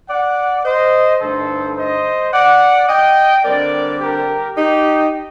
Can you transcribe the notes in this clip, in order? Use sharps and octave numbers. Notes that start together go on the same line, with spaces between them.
D5 F#5
C5 D#5
G2 D3 A3 D#4 A4 C5
C5 D#5
D5 F#5
D#5 G5
D3 G3 C4 A#4 D5
G4 A#4
D#4 G4